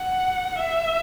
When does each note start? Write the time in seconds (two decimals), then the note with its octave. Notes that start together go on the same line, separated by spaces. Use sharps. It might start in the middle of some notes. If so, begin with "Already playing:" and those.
Already playing: F#5
0.58 E5